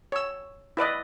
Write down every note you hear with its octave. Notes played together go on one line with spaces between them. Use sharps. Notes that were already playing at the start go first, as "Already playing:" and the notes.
C#5 E6
E4 B4 D5 D#5